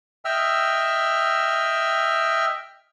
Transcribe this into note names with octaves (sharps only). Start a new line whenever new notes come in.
D#5 E5 G5 E6 F6